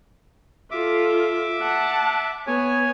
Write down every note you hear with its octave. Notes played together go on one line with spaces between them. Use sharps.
F4 A4 E5 D6
F#5 A5
B3 C#5 G#5